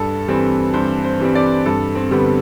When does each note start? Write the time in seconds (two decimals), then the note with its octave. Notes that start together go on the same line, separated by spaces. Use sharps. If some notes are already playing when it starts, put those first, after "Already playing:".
Already playing: G2 A4
0.28 E3 G3 C4
0.74 G2 C5
1.05 C5
1.20 E3 G3 C4
1.35 D5
1.66 G2 A4
1.95 C4
2.11 D3 G3 B3